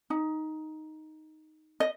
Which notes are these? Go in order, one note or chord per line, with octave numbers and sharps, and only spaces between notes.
D#4
D#5